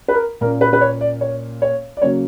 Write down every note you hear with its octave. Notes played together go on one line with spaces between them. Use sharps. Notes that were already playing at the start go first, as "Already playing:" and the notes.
B4
A#4
A#2 A#3 C#4 A#4
B4
B4
C#5
D5
C#5
C#5
D5
C#3 F#3 A#3 C#4 C#5